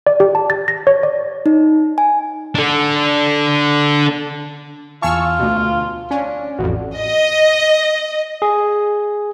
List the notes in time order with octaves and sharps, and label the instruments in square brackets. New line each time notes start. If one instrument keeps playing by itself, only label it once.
[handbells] D5
G4
A5
A6
A#6
C#5
D5
[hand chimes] D#4
G#5
[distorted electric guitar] D4 A4
[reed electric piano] E2 G#5 A5 [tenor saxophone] F4 [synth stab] C#6 E6 F6
[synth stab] D2 B2
[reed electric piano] F5
[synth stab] C#4 [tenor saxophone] D4
[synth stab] A1 F2 [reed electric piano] F#4
[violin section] D#5
[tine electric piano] G#4